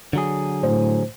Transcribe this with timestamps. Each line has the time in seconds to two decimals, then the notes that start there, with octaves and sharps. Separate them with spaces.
0.13 D3 F#3 G#4
0.63 A2 C5